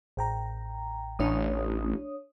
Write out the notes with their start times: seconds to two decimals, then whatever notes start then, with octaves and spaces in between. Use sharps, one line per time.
0.17 A1 G5 A#5
1.19 A1 D4 C#5 D#6